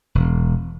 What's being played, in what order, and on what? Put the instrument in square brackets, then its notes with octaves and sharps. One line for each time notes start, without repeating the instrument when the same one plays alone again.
[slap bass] E1